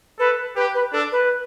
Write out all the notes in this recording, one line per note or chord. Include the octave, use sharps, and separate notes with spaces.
A4 B4
G4 B4
B4
D4 A4
B4